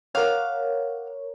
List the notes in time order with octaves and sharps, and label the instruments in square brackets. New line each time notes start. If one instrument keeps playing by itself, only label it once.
[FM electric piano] A#4 C#5 [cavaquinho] F5 F#5 D6